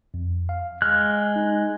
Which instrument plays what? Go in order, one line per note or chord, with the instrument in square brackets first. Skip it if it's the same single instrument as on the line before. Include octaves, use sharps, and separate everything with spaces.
[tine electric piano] F2
F5
[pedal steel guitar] G#3 F#6 [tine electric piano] F6
[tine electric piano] D#4